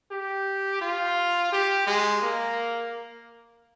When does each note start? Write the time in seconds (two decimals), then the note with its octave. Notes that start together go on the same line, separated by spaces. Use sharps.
0.11 G4
0.82 F4
1.52 G4
1.87 G#3
2.22 A#3